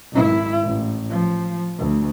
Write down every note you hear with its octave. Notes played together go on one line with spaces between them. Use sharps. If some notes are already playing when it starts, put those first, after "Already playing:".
G#1 E4
A1
F3
D2